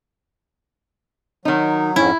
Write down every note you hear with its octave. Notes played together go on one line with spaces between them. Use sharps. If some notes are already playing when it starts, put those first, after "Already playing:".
D#3 F#3 D#4
F2 G#2 C#4 E4